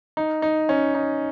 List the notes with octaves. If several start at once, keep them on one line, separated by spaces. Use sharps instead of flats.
D#4
D#4
C#4
D#4